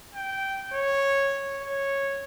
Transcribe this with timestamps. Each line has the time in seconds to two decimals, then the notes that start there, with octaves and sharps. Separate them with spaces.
0.15 G5
0.73 C#5
1.63 C#5